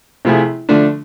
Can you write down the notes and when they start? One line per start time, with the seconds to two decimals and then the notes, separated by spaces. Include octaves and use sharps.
0.25 C3 F3 A3 E4 G#4
0.69 D3 F3 A3 D4